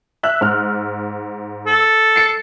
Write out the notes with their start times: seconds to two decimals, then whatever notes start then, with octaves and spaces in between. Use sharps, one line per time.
0.23 E5 E6 F#6
0.41 G#2 F6
1.66 A4
2.16 C7 C#7